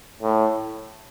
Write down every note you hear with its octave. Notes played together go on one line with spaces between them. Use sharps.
A2